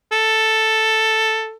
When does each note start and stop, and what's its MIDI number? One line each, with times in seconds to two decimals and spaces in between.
0.12 1.55 69